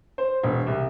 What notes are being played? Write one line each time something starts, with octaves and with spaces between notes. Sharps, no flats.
C5
E1
C2